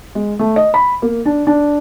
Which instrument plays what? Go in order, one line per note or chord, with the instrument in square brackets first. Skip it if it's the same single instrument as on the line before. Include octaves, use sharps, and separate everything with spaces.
[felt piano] G#3
A3
D#5
B5
A#3
D4
D4